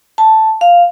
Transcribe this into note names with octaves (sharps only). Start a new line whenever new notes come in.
A5
F5